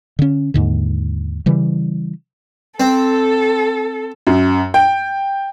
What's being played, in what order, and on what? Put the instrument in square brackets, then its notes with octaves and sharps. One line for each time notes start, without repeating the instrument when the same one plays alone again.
[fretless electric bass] D3 C#4
D#2 G#2 D3
C#3 E3 G3
[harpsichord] C4 [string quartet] A4
[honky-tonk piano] F#2
G5